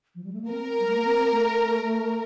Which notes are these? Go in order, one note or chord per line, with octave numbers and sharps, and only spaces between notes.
F3
G3
A3
A#3
C4 A#4
G3
A3
A#3
C4
A3